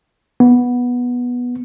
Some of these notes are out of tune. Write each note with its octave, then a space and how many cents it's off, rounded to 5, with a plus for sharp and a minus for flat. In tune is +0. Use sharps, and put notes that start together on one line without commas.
B3 -10